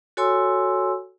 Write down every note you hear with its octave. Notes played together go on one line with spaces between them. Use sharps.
F#4 A4 C#5 G#5 C6 E6